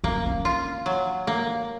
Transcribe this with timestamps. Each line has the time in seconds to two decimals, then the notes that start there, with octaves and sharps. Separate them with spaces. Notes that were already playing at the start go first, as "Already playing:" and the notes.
0.04 A#3 C#4
0.26 C#4
0.45 F4
0.86 F#3
1.27 A#3